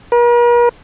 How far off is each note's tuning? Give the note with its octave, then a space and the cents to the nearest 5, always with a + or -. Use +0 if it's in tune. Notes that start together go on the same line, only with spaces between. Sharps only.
A#4 +45